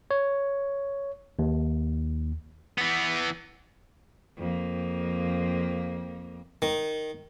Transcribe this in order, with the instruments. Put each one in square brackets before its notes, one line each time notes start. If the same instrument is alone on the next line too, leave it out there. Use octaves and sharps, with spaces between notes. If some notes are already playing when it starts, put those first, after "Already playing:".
[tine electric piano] C#5
D#2
[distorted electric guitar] E3 B3
[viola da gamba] F2 A#3
[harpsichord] D#3